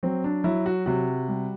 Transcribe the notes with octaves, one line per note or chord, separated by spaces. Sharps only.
F#3 C4
D4
F#3 E4
F#4
C3 F#4
G3